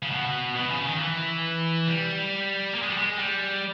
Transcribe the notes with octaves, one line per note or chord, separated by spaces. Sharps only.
C#3
B2
B2
C#3
D#3
E3
G3
A#3
G#3
G3
G#3
G3